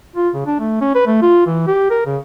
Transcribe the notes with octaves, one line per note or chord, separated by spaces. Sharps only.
F4
C#3
D4
A3
C#4
B4
A3
F4
E3
G4
A#4
C#3